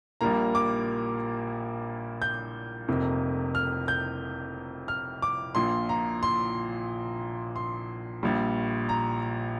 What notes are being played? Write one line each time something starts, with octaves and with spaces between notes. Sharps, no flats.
A#1 A#2 G3 A#3 A#5
D6
G6
F1 F2 C3 A#3
F6
G6
F6
D6
A#1 A#2 F3 C6
A#5
C6
C6
A#1 A#2 G3
A#5